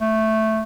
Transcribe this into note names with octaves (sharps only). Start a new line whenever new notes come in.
A3